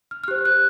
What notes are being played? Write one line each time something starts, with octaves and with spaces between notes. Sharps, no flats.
F6
F6
G4 C5 F#6
F#6